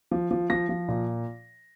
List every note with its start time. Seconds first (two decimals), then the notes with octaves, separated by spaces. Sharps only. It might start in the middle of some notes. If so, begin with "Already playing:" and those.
0.11 F3
0.31 F3
0.50 F3 A#6
0.69 F3
0.88 A#2